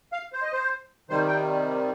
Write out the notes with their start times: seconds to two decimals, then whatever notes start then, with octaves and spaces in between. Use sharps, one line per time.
0.12 F5
0.33 C5
0.42 D#5
0.52 C5
1.10 C3 D#3 G3 C5
1.28 G5